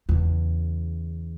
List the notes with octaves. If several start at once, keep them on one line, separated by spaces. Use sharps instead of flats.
E2 C#3